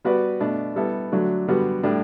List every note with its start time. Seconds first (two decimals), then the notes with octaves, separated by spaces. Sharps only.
0.04 G3 B3 F#4 B4 D5
0.40 B2 A3 D4
0.76 G3 B3 E4 A4
1.12 D3 F#3 A3 D4 F#4
1.48 D3 G3 B3 F#4
1.83 A2 G3 D4